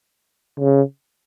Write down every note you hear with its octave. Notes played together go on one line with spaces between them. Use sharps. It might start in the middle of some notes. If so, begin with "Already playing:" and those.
C#3